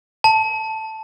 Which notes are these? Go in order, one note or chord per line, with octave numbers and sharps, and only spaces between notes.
A5